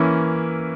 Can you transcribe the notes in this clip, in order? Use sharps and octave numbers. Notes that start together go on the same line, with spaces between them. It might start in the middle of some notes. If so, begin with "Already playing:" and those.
Already playing: E3 A#3 C#4 E4